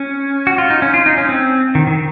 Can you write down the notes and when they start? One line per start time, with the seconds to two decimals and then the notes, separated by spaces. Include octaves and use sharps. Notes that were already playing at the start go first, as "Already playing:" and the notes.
Already playing: C#4
0.47 F#4
0.58 F4
0.70 D#4
0.82 C#4
0.94 F4
1.06 D#4
1.18 C#4
1.29 C4
1.75 D#3
1.87 D#3